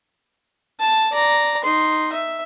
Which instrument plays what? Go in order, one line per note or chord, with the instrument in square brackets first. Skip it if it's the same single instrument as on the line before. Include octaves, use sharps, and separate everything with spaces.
[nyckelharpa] A5
D5 A#5
D#4 C6
E5